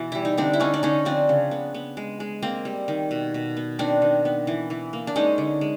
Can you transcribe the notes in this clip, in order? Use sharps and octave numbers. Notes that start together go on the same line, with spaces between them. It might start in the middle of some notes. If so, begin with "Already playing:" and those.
Already playing: B2 E3
G3 E4
D#4
D3 C4 D4
E4
D3 C#4 D#4
D4
D3 C#4 D#4
F3 C4 D4
C#3
B3
B3
G#3
G#3
A#3 C4
G3
D#3
B2
B2
B3
D#3 C4 D4
D#3
B3
E3
E3
A#3
D4
G#3 C#4 D#4
D3
G#3